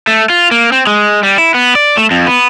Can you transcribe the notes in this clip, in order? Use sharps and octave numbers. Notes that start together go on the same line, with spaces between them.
A3
F4
A#3
C4
G#3
G3
E4
B3
D5
A3
F2
B3